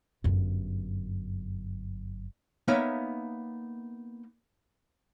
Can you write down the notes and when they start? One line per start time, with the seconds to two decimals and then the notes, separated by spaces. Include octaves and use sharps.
0.24 G1 F#2
2.68 A#3 B3 D#4 C#5 E5 F5